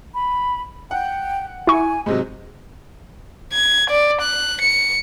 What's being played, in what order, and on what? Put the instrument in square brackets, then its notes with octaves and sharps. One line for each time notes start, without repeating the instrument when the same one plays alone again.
[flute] B5
[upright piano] F#5 [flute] G5
[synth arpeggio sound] E4 C#6 [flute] G#5
[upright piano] G#2 C3 F#3 [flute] D#5
[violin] G#6
D5
F#6
C#7